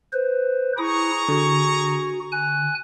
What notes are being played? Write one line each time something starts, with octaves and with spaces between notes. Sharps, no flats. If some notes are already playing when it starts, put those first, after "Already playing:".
B4 C5
E4 G#4 A#5 C#6 D#6
D3 F#4
G#5 F#6